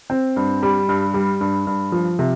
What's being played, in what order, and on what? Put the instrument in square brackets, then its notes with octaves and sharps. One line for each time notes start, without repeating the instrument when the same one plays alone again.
[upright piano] C4
G2
G3
G2
G3
G2
G2
F3
C3